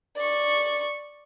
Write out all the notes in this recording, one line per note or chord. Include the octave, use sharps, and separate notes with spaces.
D5 C#6